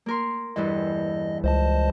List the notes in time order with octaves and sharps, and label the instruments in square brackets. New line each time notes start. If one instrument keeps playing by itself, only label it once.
[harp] A#3 A#4 C6
[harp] E2 G2 E3 [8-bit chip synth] D#5
[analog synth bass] C#2 [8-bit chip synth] C5 D#5 A5